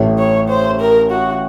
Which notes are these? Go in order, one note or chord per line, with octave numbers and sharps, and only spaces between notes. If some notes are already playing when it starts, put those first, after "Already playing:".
Already playing: A1 A2
C#5
C5
A#4
F#4